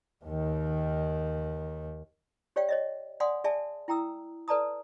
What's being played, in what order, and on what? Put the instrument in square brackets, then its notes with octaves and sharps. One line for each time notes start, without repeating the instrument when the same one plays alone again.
[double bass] D#2 D#3
[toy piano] G4 C#5 D5 F5 G5
C#5 D#5 E5
D5 F5 F#5 G#5 C6 D#6
G#4 D5 E5 G#5 A5
E4 G5 A#5 D#6 E6
A4 B4 D5 A5 A#5 D#6